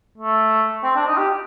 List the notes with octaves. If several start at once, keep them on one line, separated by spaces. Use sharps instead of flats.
A3
C4
D4
D#4
G4